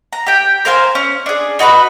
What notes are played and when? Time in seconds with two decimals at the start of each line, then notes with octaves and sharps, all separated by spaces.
0.13 A#5
0.26 G4 G5
0.65 A#4 C5 F5 G#5
0.95 C#4
1.26 D4 G#4
1.59 D#4 F#4 B4 B5